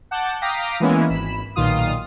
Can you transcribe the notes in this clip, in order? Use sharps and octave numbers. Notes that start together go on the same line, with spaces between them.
F#5 A5 D6 G6
F5 G5 A#5 D6 D#6 B6
E3 G#3 A#3 B3 C#4 E4
G#1 B5 E7
B1 A#2 D#3 F4 F5 D#6